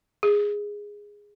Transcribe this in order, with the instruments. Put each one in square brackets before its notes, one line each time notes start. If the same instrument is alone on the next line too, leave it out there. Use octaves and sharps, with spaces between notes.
[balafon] G#4